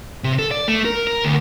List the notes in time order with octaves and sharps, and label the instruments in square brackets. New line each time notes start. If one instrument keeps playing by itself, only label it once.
[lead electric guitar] C3
A4
D5
A3
A#4
A#4
D2